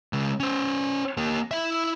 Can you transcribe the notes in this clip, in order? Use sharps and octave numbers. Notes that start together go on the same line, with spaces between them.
C#3 G#3
C#4 C5
A#3 G4
E4 E5